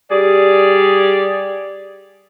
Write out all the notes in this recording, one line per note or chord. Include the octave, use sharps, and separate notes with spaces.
G3 G#4 D5